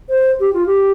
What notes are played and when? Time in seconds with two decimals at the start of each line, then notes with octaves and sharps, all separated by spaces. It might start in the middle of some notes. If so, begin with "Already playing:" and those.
0.09 C5
0.40 G4
0.53 F4
0.66 G4